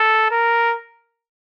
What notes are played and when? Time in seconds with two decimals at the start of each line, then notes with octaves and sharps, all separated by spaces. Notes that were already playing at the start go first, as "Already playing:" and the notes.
Already playing: A4
0.31 A#4